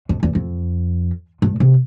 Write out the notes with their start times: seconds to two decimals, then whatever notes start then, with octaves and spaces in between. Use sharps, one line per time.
0.09 F2
0.23 E2
0.35 F2
1.42 G2
1.60 C3